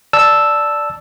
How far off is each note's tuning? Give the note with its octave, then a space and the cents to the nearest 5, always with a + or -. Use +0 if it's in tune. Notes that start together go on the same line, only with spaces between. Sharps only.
D5 +0 A5 +0 E6 +0